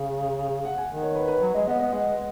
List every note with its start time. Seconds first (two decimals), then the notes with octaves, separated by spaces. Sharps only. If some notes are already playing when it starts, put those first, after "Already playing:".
Already playing: C#3
0.65 F#5
0.78 G#5
0.90 D#3 F#5
1.03 C#5
1.15 B4
1.28 B4
1.41 F#3 C#5
1.55 G#3 D#5
1.67 B3 D#5
1.80 B3 D#5
1.92 G#3 F#5